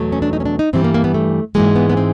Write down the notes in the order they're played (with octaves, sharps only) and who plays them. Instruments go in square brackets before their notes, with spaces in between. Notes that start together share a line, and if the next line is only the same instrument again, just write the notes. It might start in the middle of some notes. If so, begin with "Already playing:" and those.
Already playing: [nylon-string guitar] E2 B2 F#3 A3
C#4
D4
D#4
C#4
D4
D#4
G2 E3 G3 C4
A#3
A#3
B3
A3
G#2 E3 G#3 A#3
B3
B3
C4